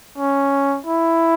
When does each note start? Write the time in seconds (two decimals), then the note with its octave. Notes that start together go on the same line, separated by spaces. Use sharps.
0.18 C#4
0.86 E4